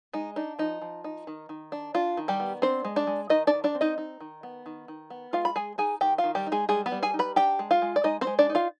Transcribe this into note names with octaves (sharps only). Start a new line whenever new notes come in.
G#3 D#4
D4 D#4
F3 D#4
F3
D#4
D#3
D#3
D4
D4 F4
D#3
G3 G4
B3
C4 D4 C5
G#3
D4 D5
G#3
D#3 D#4 D#5
D4 D5
D#3
D4 D5
C4
D#4 D#5
D#4
D#3
B3
D#3
D#3
B3
G#3 F4 F5
B5
G#3 G#4 G#5
D#4 G#4 G#5
D#3 G4 G5
F4 F5
D#3
G3 G4
D#4
G#3 G#4
G3 G#3 G#4
B3 B4
G3
G#4 G#5
D#4
B4 B5
D4 G4 G5
G#3
F4 F5
G#3
D5
G#3 D#4 D#5
C4 C5
G#3
D4 D5
D#4
F4 F5